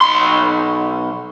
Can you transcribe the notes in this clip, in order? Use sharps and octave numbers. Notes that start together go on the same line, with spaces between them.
B1 C6